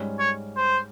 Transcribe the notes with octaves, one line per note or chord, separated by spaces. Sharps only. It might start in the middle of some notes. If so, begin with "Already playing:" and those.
Already playing: G#2 G3 C#4
C#5
C5